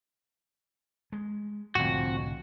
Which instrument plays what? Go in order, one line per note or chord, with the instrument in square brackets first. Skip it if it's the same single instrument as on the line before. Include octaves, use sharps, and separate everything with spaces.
[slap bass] G#3
[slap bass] C2 A2 D3 [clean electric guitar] F2 F#4